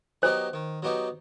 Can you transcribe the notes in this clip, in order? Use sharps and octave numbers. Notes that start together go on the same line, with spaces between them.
F#3 B3 D#4 G4 C5
D#3
F#3 B3 D#4 G4